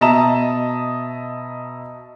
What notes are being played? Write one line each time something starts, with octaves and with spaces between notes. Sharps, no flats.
B2 D#5 E5 A5 A#5 E7